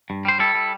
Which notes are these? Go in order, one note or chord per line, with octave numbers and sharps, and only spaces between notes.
G2
G3 C5
G3 E4 A4
G3